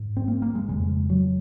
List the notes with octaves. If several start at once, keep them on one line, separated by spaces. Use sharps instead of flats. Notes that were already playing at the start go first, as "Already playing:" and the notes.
Already playing: G#2
C4
A#3
A#3
G#3
F2 C#3 G#3
F#3